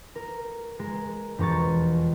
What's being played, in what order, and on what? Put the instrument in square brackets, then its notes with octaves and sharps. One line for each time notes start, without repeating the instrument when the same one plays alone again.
[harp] A#4
G#3 A#4
E1 F2 A#5 C#6 A6